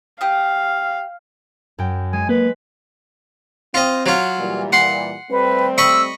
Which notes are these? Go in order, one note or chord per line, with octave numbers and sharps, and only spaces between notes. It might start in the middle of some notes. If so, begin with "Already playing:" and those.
G4 F5 D#6
F#2 G5
G#3 G#5
A#3 B4
C4 F4 D#5
F#3 F4
A#2 E3 G3
F#5 C6
G3 A3 C4 B4
D#5 B5 C#6 E6